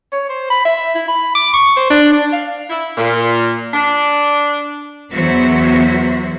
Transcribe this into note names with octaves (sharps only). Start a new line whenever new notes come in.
C#5
C5
B5
E5
E4
B5
D6
C#6
C5
D4
D4
F5
E4
A#2
D4
E2 F#3 B3 F#4 C5 E5